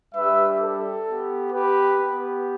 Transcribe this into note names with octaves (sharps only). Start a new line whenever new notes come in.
G3 D4 G4 B4 E5
A4
B3 G4
G4 B4
B3 G4